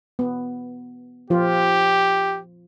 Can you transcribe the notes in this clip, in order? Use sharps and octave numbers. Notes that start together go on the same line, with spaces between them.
B3
F3 F4 G4